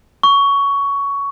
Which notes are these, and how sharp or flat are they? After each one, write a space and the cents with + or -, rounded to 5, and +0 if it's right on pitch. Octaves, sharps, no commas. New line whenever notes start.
C#6 +15